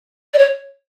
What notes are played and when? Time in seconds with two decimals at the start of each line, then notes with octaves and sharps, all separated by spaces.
0.34 D5
0.38 C#5